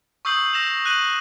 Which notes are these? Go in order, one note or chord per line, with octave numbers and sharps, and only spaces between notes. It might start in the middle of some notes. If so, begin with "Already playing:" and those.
C#6 D#6 E6 G6 C7 F#7
E6 A#6 E7 F7
F#6 D#7 F#7